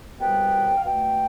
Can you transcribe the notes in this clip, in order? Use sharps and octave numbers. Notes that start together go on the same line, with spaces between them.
C2 B2 G3 B3 G5
F5
B2 A3 G5